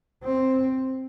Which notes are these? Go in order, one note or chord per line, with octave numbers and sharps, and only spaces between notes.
C4